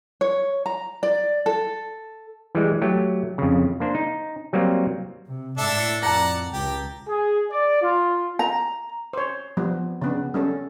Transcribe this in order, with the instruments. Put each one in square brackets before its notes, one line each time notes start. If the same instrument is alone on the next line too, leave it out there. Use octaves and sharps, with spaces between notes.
[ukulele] C#5
A#5
D5
A4
[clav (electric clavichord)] E3 G3 G#3
F#3 A3 G4
F2 C#3
A#3 D4 C5
D#4
F#3 G3 A#3 C4
[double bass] C3
[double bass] A2 [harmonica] D4 A4 E5
[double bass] F2 [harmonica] D5 F#5 [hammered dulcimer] A5 A#5
[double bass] C#2 [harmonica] G4
[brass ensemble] G#4
D5
F4
[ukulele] A#5
[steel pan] C5 C#5
F3 G3 B3
C#3 B3 D4
G3 C#4 A4